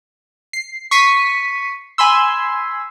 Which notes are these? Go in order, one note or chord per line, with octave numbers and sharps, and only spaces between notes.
C7
C#6 B6 C7 D#7
G#5 B5 C6 E6